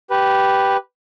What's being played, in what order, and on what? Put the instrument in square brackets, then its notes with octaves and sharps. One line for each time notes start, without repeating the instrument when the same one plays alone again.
[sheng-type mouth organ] G4 B4